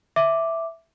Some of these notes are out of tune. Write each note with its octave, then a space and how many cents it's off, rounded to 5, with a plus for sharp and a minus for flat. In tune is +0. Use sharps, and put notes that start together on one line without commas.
E5 +0 D6 +0